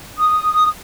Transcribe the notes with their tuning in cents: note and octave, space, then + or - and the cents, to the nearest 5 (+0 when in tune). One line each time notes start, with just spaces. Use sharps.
D#6 -5